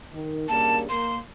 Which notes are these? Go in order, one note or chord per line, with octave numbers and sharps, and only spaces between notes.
D#3
G2 C#3 A#3 A5
A#3 C6